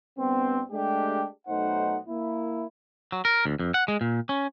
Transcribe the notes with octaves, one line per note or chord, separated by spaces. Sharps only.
G2 B3 C4
G#3 A3 D4 G4
B1 A3 D#4 C5 F#5
A#3 E4
F#3
A#4
D2
F2
F#5
G#3
A#2
C#4